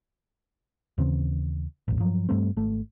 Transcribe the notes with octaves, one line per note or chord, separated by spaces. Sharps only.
D#2 C#3 E3 C4
D#1 A1
G2 F3 F#3
G2 G3 A3 C4
G#1 A3